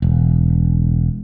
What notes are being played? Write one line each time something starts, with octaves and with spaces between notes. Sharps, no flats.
E1